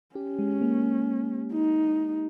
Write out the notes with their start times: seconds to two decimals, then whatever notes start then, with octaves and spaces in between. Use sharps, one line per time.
0.15 C#4 G4
0.39 G#3
0.61 A#3
1.53 D#4